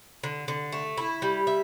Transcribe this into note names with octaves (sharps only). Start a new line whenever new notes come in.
D3
D3
A3
E4
G3
E5